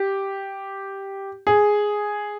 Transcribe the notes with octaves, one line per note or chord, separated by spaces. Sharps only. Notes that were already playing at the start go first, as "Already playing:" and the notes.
Already playing: G4
G#4